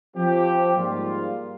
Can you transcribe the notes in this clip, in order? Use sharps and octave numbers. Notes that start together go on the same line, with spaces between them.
F3 C4 G4
G#2 G3 A#3 F4